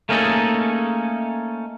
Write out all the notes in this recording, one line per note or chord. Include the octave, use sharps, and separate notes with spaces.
A3 A#3 C#4 D#4 G#4 A4